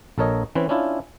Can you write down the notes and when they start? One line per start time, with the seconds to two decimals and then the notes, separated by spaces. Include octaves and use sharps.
0.18 A#1 A4 A#4 C#5 D#5
0.55 E3 C4 C#4 B4
0.69 C#4 D4 E4 F4